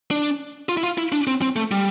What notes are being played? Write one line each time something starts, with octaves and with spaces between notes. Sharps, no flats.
D4
F4
E4
F4
E4
D4
C4
C4
A3
G3